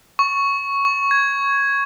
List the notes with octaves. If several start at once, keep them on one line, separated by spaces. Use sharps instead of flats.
C#6
C#6
G#6